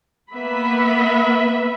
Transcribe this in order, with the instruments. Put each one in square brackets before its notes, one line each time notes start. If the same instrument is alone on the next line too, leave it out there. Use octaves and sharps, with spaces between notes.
[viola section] A#3 B3 B4 E5 B5